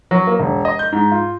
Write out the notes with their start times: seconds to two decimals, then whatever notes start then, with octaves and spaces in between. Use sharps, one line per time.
0.11 F#3
0.27 A#3
0.40 E1
0.65 D#5
0.79 G6
0.92 G#2
1.11 F4